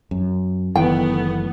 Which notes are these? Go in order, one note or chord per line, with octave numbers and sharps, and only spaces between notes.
F#2
F#1 D#3 E3 A3 B3 G5